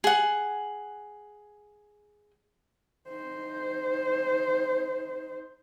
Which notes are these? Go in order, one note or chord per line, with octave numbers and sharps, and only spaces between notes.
G#4 F#5
D#4 C5